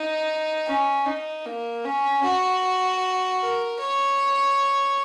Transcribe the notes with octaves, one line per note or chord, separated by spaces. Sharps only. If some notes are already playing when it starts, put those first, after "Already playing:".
Already playing: D#4
C#4
D#4
A#3
C#4
F#4
A#4
C#5